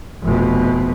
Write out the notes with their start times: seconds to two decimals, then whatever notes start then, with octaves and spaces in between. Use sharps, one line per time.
0.23 F1 B2